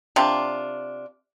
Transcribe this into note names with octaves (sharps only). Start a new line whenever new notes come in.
C3 D4 F4